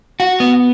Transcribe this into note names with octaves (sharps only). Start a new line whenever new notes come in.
F#4
B3